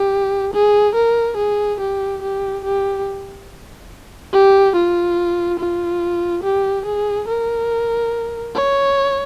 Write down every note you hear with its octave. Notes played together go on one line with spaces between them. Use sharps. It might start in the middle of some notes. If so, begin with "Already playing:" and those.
Already playing: G4
G#4
A#4
G#4
G4
G4
G4
G4
F4
F4
G4
G#4
A#4
C#5